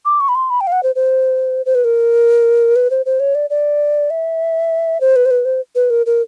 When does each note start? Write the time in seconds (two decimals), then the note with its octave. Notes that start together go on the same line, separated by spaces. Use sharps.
0.05 D6
0.20 C#6
0.29 B5
0.35 C6
0.50 B5
0.61 G5
0.67 F5
0.72 F#5
0.83 C5
0.96 C5
1.66 C5
1.75 B4
1.84 A#4
2.76 B4
2.90 C5
3.06 C5
3.20 C#5
3.35 D5
3.50 D5
4.10 E5
5.01 C5
5.16 B4
5.26 C5
5.31 B4
5.45 C5
5.75 B4
5.90 A#4
6.06 A#4